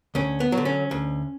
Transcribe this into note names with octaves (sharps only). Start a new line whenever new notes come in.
D2 C#4
B3
F#3
D3
C#4
D2